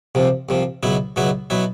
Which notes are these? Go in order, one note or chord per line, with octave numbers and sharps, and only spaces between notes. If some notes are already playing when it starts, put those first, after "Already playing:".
C2 C3 F3
C2 C3 F3
C#2 B2 F#3 B3 E4
C#2 B2 F#3 B3 E4
B2 F#3 B3 E4